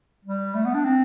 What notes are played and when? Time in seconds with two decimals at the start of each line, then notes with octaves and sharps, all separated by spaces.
0.25 G3
0.55 A3
0.65 B3
0.74 D4
0.85 C4